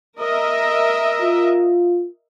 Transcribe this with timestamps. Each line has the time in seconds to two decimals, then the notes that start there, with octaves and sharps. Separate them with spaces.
0.18 A#4 D#5 E5
1.22 F4